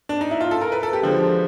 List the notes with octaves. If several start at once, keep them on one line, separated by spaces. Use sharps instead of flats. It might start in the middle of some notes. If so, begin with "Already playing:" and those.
D4
D#4
E4
F4
A4
A#4
B4
A4
G4
D3 F3 G#3